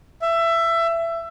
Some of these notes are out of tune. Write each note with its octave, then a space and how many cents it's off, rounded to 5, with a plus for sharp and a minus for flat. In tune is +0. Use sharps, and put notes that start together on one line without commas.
E5 +20